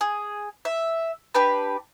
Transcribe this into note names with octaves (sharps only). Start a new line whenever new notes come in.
G#4
E5
D4 G4 B4